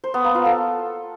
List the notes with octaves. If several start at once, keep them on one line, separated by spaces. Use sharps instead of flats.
C5
B3
A#3
F4
A4